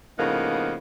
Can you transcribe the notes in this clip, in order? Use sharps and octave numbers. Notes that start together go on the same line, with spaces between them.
A2 C#3 F3 A#3 B3 D#4